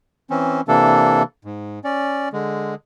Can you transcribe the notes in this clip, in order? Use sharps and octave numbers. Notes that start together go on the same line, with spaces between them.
E3 C4 C#4
C3 E3 A#3 D4 A4
G#2
C#4 D5
D3 G#3